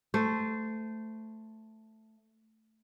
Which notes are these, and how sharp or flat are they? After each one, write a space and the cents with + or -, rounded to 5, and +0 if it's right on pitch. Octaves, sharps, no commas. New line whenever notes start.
A3 +0 C5 -20